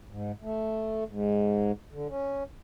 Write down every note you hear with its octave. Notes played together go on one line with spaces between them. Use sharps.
G#2
A3
G#2
D3
C#4